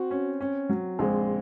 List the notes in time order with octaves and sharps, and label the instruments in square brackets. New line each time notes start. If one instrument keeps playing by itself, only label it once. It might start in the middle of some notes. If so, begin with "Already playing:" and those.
Already playing: [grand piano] C4 [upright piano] F#4
[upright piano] C#4
C#4
F#3
[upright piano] A#1 [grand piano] G#3 C4